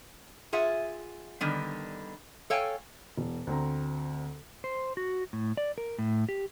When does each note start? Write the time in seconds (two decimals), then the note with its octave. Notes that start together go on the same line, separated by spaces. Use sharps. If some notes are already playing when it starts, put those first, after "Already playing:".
0.53 F4 G#4 E5 F#5
1.41 D3 D#3 G3 B3
2.50 A4 C#5 F5 G5 G#5
3.17 E1
3.47 D2 C4 A#5
4.64 C5
4.97 F#4
5.33 A2
5.57 D5
5.78 A#4
5.99 A2
6.29 G4